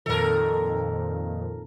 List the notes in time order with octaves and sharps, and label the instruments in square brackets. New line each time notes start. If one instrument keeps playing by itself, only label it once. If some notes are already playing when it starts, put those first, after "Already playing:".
[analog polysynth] F2 A#2 D#3 [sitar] A4 A#4